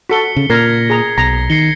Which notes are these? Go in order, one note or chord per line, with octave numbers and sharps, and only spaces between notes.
F#4 A4 B6 C#7 G7
C#3
A#2 A#4 G#6 A#6 C7
G#4 A#5
B1 A#5 A#6
D#3 C7 C#7 G7